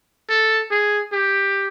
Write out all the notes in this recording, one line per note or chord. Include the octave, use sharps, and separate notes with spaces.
A4
G#4
G4